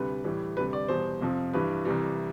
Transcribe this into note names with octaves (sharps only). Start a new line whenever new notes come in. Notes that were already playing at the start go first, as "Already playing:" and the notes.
Already playing: D2 C3 G3 B4
A2 E3 G3
D2 C3 G3 B4
D5
E2 B2 G3 C5
F2 C3 F3
G2 E3 G3 B4
C2 C3 E3 G3